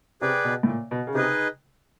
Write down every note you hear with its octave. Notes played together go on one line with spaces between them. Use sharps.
C3 G#4 B4 D5 G5
B2
A2
A#2
B2
C#3
C3 D#4 G#4 B4 D#5